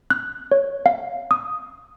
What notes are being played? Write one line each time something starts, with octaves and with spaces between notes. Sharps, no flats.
F#6
C#5
F5
D#6